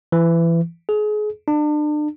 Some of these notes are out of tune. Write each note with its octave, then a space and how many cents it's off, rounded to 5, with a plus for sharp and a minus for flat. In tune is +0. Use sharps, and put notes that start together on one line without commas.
E3 +25
G#4 +30
D4 +35